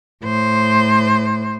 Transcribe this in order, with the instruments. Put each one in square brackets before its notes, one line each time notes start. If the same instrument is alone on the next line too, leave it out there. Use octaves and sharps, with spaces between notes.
[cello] A2 C5